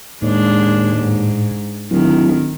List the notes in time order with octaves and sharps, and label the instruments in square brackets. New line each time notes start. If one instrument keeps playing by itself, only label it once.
[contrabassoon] D#2 [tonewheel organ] A2 [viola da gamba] G#3 D4
[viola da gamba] G#2
[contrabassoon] D1 [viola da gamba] D#3 [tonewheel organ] F#3 E4